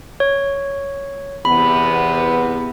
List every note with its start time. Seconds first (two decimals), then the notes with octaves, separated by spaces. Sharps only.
0.20 C#5
1.45 E2 C3 B3 B5